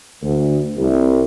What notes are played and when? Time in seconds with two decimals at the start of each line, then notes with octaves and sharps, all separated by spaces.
0.23 D2
0.77 C2